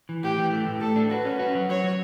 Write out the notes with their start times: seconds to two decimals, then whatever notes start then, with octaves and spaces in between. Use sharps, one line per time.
0.09 E3
0.23 A2 G4
0.38 E3
0.53 A3
0.67 A2
0.81 A3 A4
0.96 D4
1.10 F#4 B4
1.25 C#4
1.39 F#4
1.55 F#3
1.69 F#3 C#5
1.84 F#3